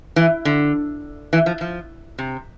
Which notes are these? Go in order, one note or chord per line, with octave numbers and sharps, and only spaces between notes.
E3
D3
E3
F3
F3
C3